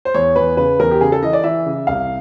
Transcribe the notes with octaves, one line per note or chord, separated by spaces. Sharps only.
C5
E2 C#5
E2 B4
C#3 B4
E2 A#4
G4
C#3 G#4
A4
E3 D#5
D5
E3 E5
C#3
C2 F5